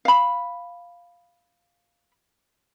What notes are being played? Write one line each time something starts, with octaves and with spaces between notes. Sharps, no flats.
F5 B5